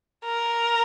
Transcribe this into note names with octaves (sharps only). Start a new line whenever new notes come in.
A#4